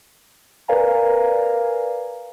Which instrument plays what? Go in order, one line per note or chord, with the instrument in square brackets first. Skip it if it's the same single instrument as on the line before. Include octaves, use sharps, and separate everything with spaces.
[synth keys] A#4 B4 D5 F5 G#5 A#5